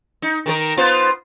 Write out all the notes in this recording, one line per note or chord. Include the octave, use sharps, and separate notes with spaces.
D#4
D#3 A4 A#4
B3 F4 C5